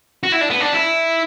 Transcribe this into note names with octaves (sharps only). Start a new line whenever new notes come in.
F#4
E4
D4
B3
D4
E4